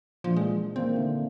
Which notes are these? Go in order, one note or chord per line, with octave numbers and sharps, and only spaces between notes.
A#2 E3 F3 D4
G#3
D#3 A#3 C4
D3 A3